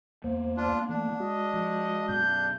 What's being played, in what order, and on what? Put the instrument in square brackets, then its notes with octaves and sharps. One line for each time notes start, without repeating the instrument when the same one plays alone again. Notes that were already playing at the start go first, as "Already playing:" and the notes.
[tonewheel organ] E2 C5 [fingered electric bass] A#3 B3
[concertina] D4 F4
[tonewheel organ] E3 A3 [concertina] D4
[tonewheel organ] G#3 F#4 [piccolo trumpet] D#5
[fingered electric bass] F3
[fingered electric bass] F#2 B2 [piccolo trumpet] G6